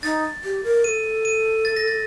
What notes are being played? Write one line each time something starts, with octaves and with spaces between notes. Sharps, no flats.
D#4 A6
G4
A#4
A4 D#7
D#7
A6
A#6
A6